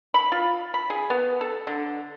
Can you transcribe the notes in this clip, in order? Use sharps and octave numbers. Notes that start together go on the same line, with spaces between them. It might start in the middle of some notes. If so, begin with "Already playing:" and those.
B5
F4
B5
G#4
B3
A4
D3